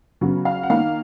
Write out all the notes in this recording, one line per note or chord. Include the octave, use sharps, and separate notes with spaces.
C#3 F#3 B3
F5
F#5
D#3 A#3 F5